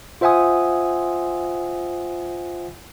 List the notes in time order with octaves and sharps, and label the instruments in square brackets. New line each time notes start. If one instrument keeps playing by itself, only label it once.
[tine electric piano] F4 C5 E5 F#5 G#5 D#6